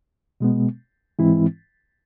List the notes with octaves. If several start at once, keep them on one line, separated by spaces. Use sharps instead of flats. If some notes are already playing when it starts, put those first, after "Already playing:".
B2 G#3 B3
G#2 E3 G#3 C4 E4